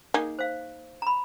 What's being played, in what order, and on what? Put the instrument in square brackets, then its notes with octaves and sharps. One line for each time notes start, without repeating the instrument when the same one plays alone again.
[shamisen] A#3 D#4 G#4
[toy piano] C5 F5
A#5 B5